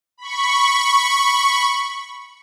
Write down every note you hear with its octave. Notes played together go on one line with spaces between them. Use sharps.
B5 C#6